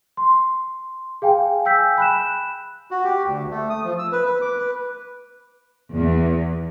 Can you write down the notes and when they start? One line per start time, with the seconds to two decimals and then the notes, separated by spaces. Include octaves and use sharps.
0.17 C6
1.22 G#4 F5 G5 G#5
1.65 G5 G#5 E6 G6 B6
1.98 B5 F#6 E7
2.91 F#4
3.04 G4
3.25 D2
3.51 A3
3.70 D#6
3.84 F3
3.99 E6
4.12 B4
4.25 B4
4.41 D6
4.58 B4
5.94 E2